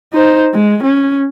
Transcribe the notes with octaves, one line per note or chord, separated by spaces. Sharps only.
D#4 C5
G#3
C#4